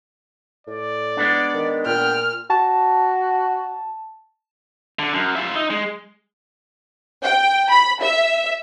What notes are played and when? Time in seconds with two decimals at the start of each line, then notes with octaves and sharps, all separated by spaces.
0.67 A2 D5
1.17 G#3 B3 D4
1.54 D#3
1.86 A#2 G5 F6
2.50 F#4 A5
4.99 D3
5.13 F#2
5.36 F4 E5
5.55 D#4
5.70 G#3
7.23 G5
7.71 B5
8.01 E5